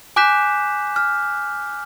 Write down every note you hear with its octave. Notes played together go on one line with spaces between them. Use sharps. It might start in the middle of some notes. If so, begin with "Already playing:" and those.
G#5 D6 F#6 G6 B6 E7
F6